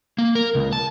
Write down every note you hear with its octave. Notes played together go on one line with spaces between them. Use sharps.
A#3
A#4
C#2
A5